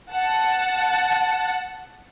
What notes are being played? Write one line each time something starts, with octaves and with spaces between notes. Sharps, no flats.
F#5 A5